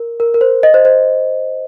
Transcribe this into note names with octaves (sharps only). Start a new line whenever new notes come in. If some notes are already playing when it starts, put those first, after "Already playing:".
Already playing: A#4
A#4
A#4
C5
D#5
C5
C5